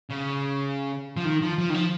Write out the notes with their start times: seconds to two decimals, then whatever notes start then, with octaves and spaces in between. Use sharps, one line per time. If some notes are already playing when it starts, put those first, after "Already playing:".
0.10 C#3
1.17 F3
1.25 D#3
1.42 F3
1.58 F3
1.70 D#3
1.74 F3